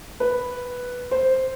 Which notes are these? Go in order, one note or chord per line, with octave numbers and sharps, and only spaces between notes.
B4
C5